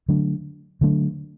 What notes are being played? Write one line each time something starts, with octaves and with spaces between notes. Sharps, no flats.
D3 F#3 A3 D4
D3 F#3 A3 D4